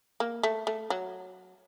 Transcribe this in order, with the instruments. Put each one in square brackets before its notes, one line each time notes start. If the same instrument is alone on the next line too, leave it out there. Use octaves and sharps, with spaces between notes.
[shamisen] A#3
A3
A3
F#3